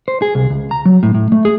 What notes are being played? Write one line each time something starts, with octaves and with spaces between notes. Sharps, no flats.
C5
G#4
C2
C#2
A#5
F#3
A2
A2
A3
G#4